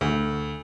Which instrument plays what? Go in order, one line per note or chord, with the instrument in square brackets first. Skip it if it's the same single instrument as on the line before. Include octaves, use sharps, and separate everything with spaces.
[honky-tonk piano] D2